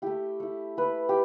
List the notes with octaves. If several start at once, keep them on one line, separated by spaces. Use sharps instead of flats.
A3 E4 G4
A3 E4
A3 E4 B4
G4